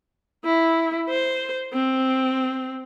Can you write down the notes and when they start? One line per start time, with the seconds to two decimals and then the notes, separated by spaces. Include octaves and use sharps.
0.45 E4
1.09 C5
1.73 C4